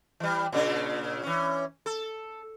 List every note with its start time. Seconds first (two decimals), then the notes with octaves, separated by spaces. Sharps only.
0.20 E3 G3
0.52 A#2 C#3 D4
1.23 E3 C#4
1.86 A4